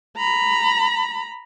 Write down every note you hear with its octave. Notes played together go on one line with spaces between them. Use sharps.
A#5 B5